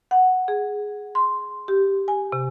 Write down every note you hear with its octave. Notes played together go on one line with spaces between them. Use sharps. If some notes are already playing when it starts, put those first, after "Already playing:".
F#5
G#4
C6
G4
G#5
C3